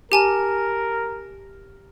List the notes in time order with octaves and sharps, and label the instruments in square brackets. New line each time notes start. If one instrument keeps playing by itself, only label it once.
[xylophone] G4 G#5 A5 [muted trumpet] A#4